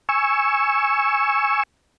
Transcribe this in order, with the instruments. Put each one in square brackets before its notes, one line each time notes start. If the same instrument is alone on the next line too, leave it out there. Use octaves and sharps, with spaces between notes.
[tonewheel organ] G#5 C#6 E6